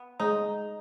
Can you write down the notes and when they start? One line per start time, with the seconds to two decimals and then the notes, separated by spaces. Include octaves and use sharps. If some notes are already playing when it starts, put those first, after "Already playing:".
Already playing: B3
0.20 G#3 D#4